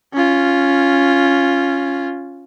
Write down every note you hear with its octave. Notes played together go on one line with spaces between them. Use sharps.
C#4 F4